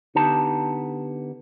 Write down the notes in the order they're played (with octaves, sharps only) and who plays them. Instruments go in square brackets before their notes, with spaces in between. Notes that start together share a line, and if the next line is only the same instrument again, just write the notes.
[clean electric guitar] D3 B3 D#4 G4 A5